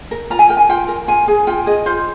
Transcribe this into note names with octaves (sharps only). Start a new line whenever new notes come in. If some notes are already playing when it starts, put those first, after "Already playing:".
A#4
F4 A#5
G#5
A#4 G5
G#5
F4 G5
A#4
F4 G#5
G#4 G#5
F4 G5
G#4 D#5
F4 C5